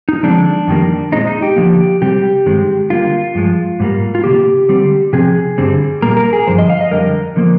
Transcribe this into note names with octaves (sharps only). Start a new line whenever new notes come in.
D#4
D3 F3 G#3 C4 D4
F2 D#3 G3 A#3
A#2 G#3 C4 D#4
D#4
G4
D3 F3 A#3
C3 G3 C4 G4
G2 D#3 G#3 C4
D3 G3 A#3 F4
G2 F3 G#3
G#2 G3 A#3
F4
D#3 A#3 G4
C3
D3 G3 C4
C3 F3 C4 G#4
G2 D3 G3 C4
A#2 G3 A#3 A#4
A#4
G#4
G2 D3 F3 C5
D#5
F5
D#5
F2 D3 G3 A#4
D3 F3 A#3